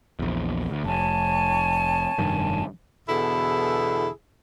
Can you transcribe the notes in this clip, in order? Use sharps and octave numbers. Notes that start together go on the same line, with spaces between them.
A#1 E2
D2
F1 C#5 G#5 A5
F1 G2 D#3
E2 B2 D3 E4 G#4 A4